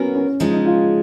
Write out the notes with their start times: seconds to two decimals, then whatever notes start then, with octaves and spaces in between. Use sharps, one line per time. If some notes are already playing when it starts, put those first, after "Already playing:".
Already playing: F#3 B3 C#4 F#4 A#4 C#5
0.15 C#4
0.40 C#3 F3 G#3 C#4 D#4
0.54 D#4
0.66 F4